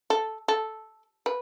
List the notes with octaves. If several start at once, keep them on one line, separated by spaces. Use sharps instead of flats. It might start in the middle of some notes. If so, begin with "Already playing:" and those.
A4
A4
B4